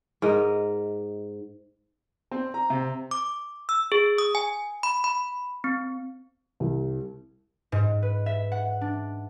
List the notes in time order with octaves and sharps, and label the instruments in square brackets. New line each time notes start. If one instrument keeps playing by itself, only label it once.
[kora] G#2 A#4 D#5
[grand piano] C4
A#5
C3
[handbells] D6
E6
G#4
D#6
G#5
B5
B5
C4
[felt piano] C2
[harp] G#2
B4
E5
F#5
D4